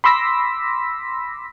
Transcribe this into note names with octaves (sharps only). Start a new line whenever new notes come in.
B5 C6 D6 E6 A#6 B6